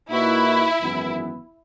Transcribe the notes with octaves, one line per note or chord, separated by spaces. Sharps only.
A#2 A#3 D#4 E4 F#4 B4
G#1 F#2 E3 B3